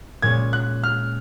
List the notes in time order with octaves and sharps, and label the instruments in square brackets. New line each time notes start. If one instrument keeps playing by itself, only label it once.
[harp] A#2 G#3 C#4 [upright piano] G#6
[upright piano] F#6
F6